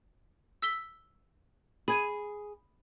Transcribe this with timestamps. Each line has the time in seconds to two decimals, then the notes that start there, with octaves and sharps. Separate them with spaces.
0.62 E6 B6 G7
1.88 G#4 B5 G#6 D#7